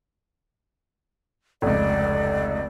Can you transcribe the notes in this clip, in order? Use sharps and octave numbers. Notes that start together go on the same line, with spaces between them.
F1 C#2 D5